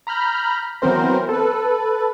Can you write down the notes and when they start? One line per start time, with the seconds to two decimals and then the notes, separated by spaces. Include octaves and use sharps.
0.07 A#5 B5 F6 G6
0.82 E3 F#3 B3 C4 A#4 C5
1.29 A4 B4